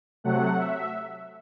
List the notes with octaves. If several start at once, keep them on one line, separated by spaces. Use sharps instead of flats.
C3 F#3 A3 F#5
E5